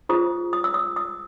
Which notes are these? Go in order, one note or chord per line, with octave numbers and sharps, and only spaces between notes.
F4 G#4 C5 D#6
D#6
E6
D#6
D#6